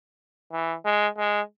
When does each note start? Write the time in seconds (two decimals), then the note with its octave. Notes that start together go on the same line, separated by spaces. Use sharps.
0.52 E3
0.85 G#3
1.18 G#3